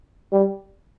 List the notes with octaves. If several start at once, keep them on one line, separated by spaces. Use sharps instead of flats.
G3